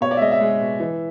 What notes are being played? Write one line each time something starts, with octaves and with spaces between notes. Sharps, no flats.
B2 C#5
D5
E5
G#3 D#5
E5
G#3
B2
E3